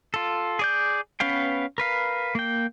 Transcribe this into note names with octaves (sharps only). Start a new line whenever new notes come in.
F4 A4
G#4 D5 G6
B3 C#4 B4 F5 G5
A#4 B4 F5
A#3 G5